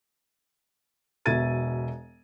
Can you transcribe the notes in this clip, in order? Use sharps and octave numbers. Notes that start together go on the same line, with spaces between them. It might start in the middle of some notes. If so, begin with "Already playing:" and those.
E1 B2 E5 G#6 A6 D#7